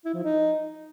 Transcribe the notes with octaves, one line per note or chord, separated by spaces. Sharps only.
E4
F3
D#4